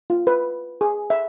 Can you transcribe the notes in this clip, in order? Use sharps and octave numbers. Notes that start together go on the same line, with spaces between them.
F4
B4
G#4
E5